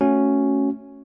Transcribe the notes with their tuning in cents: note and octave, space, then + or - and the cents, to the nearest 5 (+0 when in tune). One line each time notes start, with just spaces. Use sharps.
A3 +0 C#4 +0 F#4 +0